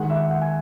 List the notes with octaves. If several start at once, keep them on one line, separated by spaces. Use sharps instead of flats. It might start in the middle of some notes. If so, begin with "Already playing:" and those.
Already playing: D#3 G#3 F#5
E5
F#5
G#5